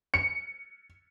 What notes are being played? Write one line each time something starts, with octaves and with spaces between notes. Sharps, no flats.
C#7